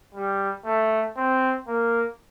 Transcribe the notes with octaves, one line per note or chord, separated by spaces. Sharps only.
G3
A3
C4
A#3